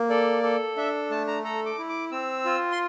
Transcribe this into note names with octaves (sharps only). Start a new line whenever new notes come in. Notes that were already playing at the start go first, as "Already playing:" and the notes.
Already playing: A#3
A4 D5
A4
D4 E5
A3 A5
A#5
A4 A#5
D6
E4
D6
C4 E6
F4
C6